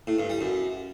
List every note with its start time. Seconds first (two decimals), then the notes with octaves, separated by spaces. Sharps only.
0.07 A2
0.19 G2
0.30 G3
0.41 F#2